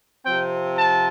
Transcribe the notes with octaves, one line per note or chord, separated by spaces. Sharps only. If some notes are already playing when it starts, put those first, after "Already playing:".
C3 F3 C4 G5
A5